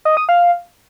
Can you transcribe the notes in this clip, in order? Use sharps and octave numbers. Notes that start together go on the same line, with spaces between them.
D#5
D#6
F5